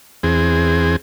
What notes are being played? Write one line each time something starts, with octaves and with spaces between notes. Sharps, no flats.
E2 C4 G#4